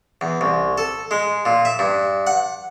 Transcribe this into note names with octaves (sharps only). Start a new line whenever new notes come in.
E2
C2
A4
G#3
A#2
E5
G2
F#5